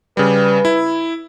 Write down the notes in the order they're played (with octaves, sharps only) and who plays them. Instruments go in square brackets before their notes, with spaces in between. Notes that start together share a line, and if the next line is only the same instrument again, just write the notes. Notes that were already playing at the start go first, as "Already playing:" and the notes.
[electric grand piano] C#3 G3 [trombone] B4
[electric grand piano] E4